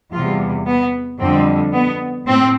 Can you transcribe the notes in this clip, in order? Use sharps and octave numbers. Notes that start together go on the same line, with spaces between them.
E2 C3 G3 F4
B3
F2 D3 G3 C4
B3
A2 C4